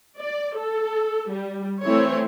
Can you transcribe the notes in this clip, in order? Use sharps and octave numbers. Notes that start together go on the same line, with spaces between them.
D5
A4
G3
E3 A3 C4 E4 C#5